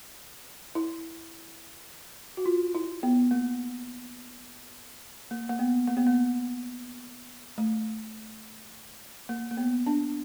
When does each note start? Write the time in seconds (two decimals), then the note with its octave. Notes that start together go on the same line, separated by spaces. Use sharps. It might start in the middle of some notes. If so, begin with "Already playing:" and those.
0.75 E4
2.37 F#4
2.46 F4
2.75 E4
3.03 B3
3.31 A#3
5.31 A#3
5.49 A#3
5.59 B3
5.87 A#3
5.97 B3
6.07 A#3
7.58 A3
9.29 A#3
9.51 A#3
9.57 B3
9.87 D4